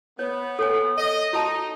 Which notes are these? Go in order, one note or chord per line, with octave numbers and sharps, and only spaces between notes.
B3 C#5
A4 C#5 G#5
D#5
D#4 F#4 A5